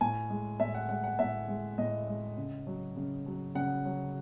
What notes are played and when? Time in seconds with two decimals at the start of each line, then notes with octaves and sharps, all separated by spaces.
0.01 A2 G#5
0.30 G#3
0.60 A2 E5
0.74 F#5
0.89 G#3 F#5
1.04 F#5
1.19 A2 E5
1.48 G#3
1.78 A2 D#5
2.08 G#3
2.37 C#3
2.67 F#3
2.97 C#3
3.26 F#3
3.55 C#3 F#5
3.85 F#3